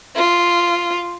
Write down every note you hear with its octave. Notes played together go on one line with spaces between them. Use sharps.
F4